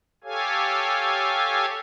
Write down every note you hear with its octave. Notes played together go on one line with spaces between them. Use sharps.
G4 A4 C#5 F5 G#5